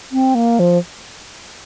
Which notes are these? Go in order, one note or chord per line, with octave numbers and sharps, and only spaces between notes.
C4
A#3
F3